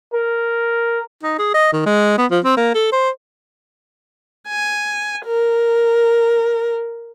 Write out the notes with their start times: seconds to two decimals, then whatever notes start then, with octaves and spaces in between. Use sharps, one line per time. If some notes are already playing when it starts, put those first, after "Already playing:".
0.14 A#4
1.23 D#4
1.39 G#4
1.54 D#5
1.73 D#3
1.86 G#3
2.18 B3
2.31 F3
2.44 C4
2.57 A#3
2.75 A4
2.92 C5
4.49 G#5
5.26 A#4